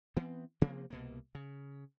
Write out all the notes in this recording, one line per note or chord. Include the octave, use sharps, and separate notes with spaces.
E3 B3 C4
C3 F3 A#3 C4
C2 B2 A#3
C#3